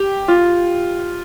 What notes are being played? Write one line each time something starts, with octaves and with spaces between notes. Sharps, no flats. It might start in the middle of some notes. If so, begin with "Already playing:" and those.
Already playing: G4
F4